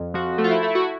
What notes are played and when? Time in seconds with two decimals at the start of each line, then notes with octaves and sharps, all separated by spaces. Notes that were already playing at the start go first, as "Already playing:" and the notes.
Already playing: F2
0.14 F3 F#4
0.38 A3
0.44 F4
0.51 E4
0.63 A3
0.75 F#4